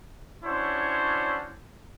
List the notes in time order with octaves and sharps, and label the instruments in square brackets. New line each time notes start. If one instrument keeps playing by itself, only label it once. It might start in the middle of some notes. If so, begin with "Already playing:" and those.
[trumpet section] C#4 D4 E4 F#4 C5 C#5